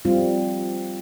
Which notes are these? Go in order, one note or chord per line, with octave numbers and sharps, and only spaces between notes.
G3 C4 F4